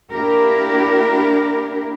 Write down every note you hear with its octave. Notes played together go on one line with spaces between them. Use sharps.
A#3 D4 E4 G4 A#4